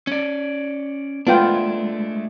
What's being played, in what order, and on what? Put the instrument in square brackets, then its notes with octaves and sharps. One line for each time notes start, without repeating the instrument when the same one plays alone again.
[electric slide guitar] C#4 D5
[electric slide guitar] G#3 A3 D4 [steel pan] B3 F4 G5